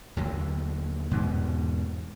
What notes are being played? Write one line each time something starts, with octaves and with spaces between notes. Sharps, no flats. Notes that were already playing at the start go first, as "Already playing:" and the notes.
D#2 D3 F#3
E2 G#2 B2